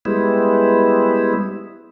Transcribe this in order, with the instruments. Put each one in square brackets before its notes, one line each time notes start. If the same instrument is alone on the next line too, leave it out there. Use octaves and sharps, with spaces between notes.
[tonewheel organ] G3 G#3 B3 E4